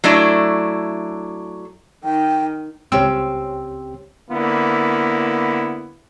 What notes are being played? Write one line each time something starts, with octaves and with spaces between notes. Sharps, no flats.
F#3 A3 D4 E4
D#3 G5
C#2 C4 C#4 G4 E6
D3 A#3 B3 E4